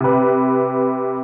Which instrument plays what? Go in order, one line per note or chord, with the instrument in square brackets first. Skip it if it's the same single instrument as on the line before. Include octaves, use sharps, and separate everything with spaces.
[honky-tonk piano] C3 B4